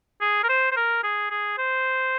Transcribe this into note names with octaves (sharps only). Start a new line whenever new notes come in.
G#4
A#4
C5
C5
A#4
G#4
G#4
C5